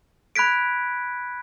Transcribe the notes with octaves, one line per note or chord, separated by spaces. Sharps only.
B5 F#6 G#6 B6 D7